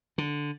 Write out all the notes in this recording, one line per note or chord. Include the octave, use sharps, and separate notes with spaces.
D3